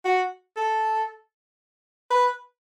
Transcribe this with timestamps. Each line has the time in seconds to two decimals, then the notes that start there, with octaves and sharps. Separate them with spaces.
0.05 F#4
0.56 A4
2.11 B4